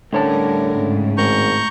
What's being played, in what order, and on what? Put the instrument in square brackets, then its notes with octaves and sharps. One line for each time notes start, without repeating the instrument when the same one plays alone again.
[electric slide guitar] A2 C#5 A5 [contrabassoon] D3 [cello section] G3 C#4 A#4
[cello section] G#2 C#3
[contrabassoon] G#1 [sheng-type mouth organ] A#5 C#6 G6